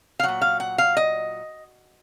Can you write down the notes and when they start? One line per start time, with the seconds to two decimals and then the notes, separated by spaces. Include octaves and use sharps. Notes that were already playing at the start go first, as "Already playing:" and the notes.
0.20 F5
0.23 A#2 F#3 F#5
0.41 F5
0.60 F#5
0.78 F5
0.97 D#5